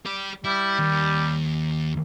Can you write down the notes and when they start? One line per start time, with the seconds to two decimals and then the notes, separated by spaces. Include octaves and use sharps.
0.06 G4 D5
0.44 G3 E4
0.79 D#2